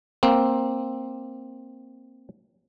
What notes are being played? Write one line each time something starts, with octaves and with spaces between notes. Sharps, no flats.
A#3 C4